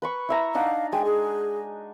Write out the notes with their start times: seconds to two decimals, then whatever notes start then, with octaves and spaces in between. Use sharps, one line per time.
0.02 B4 B5 C#6
0.29 E4 E5 A#5
0.55 D4 D#4 F5 F#5
0.92 G#3 G5 G#5
1.05 G#4